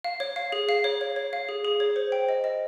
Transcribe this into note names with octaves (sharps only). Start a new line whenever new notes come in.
F5
C#5
F5
G#4
F5
C#5
C#5
C#5
F5
G#4
G#4
C#5
C5
G5
D#5
D#5